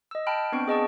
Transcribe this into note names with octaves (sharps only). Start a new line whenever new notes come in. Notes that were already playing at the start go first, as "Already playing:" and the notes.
D#5 E6
G5 A5 B5 F6 D7
B3 C4 D4 C#6 D7
G#4 D#5 A5 C#6